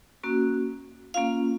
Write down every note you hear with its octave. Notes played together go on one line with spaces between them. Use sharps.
A#3 C#4 F#4
A#3 C#4 F4 F5